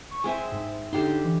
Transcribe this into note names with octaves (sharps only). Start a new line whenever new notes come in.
C#6
G#3 C4 E5 G#5
G#2
D3 D#4 G4 C6
E3